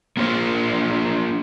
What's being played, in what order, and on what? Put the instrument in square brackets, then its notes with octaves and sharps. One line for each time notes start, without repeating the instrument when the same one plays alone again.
[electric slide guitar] A#3 D4 F4 C5